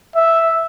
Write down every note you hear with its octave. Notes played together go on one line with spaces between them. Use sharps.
E5